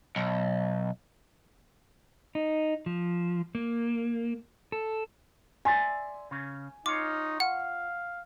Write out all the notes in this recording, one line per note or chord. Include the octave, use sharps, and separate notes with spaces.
B1
D#4
F3
A#3
A4
D5 E5 G#5 C6
C#3 C#4
D#4 F4 C#5 D6
F5 F#5